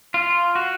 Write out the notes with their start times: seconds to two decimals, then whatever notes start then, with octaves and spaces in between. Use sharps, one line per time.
0.14 F4
0.56 F#4